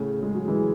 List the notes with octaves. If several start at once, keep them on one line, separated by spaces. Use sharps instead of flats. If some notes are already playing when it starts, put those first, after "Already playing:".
Already playing: A2 C#3
G#3
F#3
E3 G#3